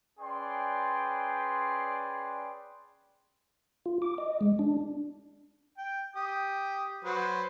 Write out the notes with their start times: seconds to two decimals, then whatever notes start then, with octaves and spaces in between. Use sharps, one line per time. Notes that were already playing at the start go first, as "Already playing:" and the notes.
0.19 C#4 G#4 B4 D5 G5 C6
3.86 F4
4.02 D6
4.18 D#5
4.41 G#3
4.59 D4
5.78 G5
6.16 G4 D#6
7.05 F#3 B4 C5